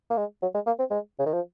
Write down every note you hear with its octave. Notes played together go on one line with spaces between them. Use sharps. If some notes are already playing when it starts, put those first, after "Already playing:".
A#3
G#3
F#3
G#3
A#3
C4
G#3
C#3
D#3
F3